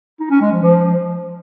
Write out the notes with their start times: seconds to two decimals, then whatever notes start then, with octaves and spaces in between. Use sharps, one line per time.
0.20 D#4
0.31 C#4
0.41 G#3
0.52 F3
0.63 F3